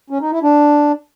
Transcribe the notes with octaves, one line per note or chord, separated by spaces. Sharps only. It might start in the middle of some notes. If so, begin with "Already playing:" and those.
C#4
D#4
E4
D4